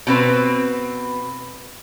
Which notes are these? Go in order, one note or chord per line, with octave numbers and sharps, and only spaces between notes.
B2 C4 B4